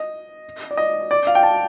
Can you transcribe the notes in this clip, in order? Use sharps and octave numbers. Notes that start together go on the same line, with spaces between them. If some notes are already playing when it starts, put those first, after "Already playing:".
Already playing: D#5
D5
D#5
D5
F5
G5
A5